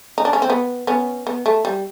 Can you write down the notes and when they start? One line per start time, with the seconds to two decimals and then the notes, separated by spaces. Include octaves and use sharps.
0.18 D#4
0.25 D4
0.33 C#4
0.42 C4
0.50 B3
0.87 B3 C#4
1.27 B3
1.46 A3
1.65 G3